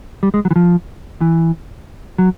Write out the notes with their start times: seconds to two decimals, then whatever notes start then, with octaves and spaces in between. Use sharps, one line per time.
0.23 G3
0.34 G#3
0.45 F#3
0.51 E3
0.56 F3
1.21 E3
2.18 F#3